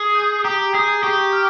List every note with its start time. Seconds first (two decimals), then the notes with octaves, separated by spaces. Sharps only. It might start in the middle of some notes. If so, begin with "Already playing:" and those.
Already playing: G#4
0.15 D#6 G6
0.44 G4 A#5
0.74 G#4 D#6 G6
1.03 G4 C#6
1.33 F6